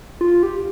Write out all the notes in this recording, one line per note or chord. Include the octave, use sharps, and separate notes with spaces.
F4
G4